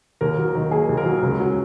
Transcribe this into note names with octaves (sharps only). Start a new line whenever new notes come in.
D#2 A#4
F#3
D#3
A#3 G#4
D#2
A#4
F#3
C#2
F#3